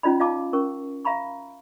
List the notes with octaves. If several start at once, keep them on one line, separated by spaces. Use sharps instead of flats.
C#4 D#4 F4 D5 D#5 B5
F4 D#5 F5 A5 D6
C#4 A#4 C#6
E5 F5 A#5 B5 C#6